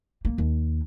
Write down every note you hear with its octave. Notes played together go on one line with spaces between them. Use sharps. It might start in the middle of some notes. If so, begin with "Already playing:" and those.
A#3
D#2